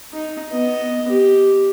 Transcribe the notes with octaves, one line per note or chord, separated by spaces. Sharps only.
D#4
B3 D#5
G4